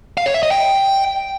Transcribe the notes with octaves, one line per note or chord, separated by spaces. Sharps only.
F5
C#5
E5
D#5
G5